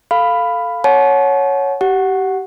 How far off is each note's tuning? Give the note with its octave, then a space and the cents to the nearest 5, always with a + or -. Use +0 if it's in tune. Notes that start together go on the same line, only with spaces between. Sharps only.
A4 +0 F5 +0 B5 +5
C#5 +0 F#5 +0 A5 -40
G4 -25 F#5 +0